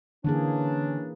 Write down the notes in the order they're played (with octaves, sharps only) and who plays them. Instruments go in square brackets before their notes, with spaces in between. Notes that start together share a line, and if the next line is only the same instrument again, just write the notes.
[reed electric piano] D3 [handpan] E3 A#3 G#4 [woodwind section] C#4 D4